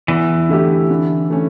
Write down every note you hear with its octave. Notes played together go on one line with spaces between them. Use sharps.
E2 E3
D3 A3 E4 G4
D3
A3 C#4